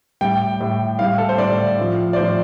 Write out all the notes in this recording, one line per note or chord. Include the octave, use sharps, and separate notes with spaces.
A2 G3 G5
A2 G3
A2 G3 F5
A4
C5
A2 G3 D5
A2 F3
D5
A2 F3 C5